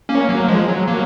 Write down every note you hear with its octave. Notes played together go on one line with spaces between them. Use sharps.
A#3 C#4
F#3 A#3
F3 G#3
F#3
F#3 A#3